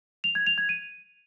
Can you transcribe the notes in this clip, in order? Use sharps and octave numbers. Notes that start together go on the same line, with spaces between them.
F7
G#6
F7
G#6
D#7